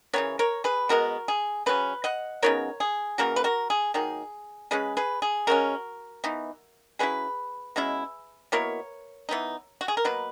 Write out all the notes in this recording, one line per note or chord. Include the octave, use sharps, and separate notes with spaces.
C#3 E3 B3 A#4 C#5
A#4 C#5
G#4 B4
B2 G#3 B3 F#4 A#4
G#4
C#3 F#3 C#4 B4
D#5 F#5
C#3 F#3 B3 D#4 A#4 C#5
G#4
C#3 E3 A#3 F#4 A#4
B4
F#4 A#4
G#4
D#3 F#3 A#3 D#4 G#4
C#3 G#3 C#4 G#4 B4
G#4 B4
G#4
C#3 G#3 C#4 F#4 A#4
E3 B3 D#4
F#3 C#4 E4 G#4 B4
B2 G#3 C#4 E4
B2 A#3 E4 A#4 C#5
E3 B3 D#4
F#4
G#4
A#4
B2 F#3 A#3 B4